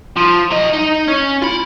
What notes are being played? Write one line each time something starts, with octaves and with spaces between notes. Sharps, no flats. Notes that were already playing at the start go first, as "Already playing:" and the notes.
F3
F#3 D#5
D#4
C#4
F4 B5